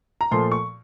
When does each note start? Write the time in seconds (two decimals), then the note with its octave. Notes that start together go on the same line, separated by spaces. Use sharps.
0.21 A#5
0.31 A#2 F3 A3 C6
0.52 C#6